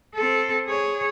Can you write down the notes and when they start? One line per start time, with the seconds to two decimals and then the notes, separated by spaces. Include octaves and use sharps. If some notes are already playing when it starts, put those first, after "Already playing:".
0.15 C4 A4
0.66 G#4 C#5